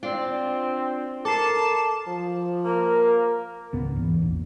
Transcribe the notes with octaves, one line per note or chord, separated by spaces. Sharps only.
C4 D4 F4 D5
A4 A#4 A5 D6 C7
F3
A#3 A#4
C#2 G#2 B3
E2
A#1